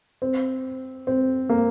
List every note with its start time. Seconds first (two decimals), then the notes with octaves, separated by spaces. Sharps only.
0.22 C4
1.07 C4
1.49 A#3